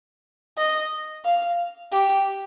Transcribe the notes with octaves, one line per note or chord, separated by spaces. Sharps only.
D#5
F5
G4